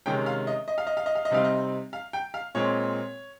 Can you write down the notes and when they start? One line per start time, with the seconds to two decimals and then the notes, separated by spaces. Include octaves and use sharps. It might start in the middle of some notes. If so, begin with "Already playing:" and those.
0.06 C3 D#3 G#3 C#4 G5
0.26 F5
0.47 D#5
0.68 D#5
0.78 F5
0.87 D#5
0.97 F5
1.06 D#5
1.15 F5
1.25 D#5
1.31 C3 G3 C4 D#4 F5
1.44 D#5
1.93 F5
2.13 G5
2.34 F5
2.55 A#2 G#3 C4 C#5